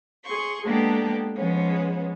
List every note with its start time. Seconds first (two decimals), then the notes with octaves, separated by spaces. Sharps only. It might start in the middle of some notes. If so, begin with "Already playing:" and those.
0.24 G#4 C6 C#6
0.65 G#3 A#3 B3 D4 G4 A4
1.35 F3 G#3 B3 C#4